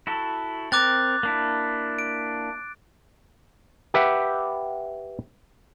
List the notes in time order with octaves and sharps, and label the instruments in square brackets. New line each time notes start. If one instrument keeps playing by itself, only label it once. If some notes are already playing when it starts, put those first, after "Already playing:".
[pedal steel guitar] E4 F#4 A4
[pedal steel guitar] C4 A#4 [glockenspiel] D6 F#6 A6
[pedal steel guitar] A#3 D4 E4
[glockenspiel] D7
[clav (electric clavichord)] G4 B4 E5 F#5